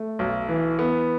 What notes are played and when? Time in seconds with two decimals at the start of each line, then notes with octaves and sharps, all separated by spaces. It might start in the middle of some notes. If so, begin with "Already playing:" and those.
Already playing: A3
0.19 B1
0.49 E3
0.79 B3